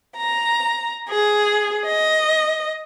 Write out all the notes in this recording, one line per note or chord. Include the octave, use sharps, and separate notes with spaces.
A#5
G#4
D#5